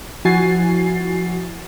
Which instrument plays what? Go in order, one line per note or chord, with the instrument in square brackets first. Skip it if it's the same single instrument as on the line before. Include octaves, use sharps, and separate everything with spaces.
[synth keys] F3 E4 F#4 G#5 A6 C7